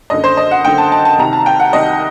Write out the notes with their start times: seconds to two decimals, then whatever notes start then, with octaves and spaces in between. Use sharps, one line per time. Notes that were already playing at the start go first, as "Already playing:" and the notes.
0.10 F#1 F#2 D3 D#5
0.24 C5
0.37 D#5
0.51 F#5
0.64 F#1 F#2 D3 G5
0.78 A5
0.92 A5
1.05 A5
1.18 C2 C3 D#3 A#5
1.33 A5
1.46 G5
1.60 F#5
1.73 C2 C3 D#3 D#5